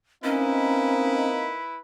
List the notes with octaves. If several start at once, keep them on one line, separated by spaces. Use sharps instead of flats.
A#3 C4 C#4 D#4 E4 B4 B5